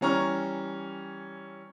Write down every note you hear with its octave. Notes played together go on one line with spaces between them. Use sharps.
E3 G3 C#4 A#5 C#6 F6